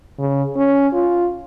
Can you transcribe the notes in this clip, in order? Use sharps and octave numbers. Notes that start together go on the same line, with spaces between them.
C#3
C#4
F4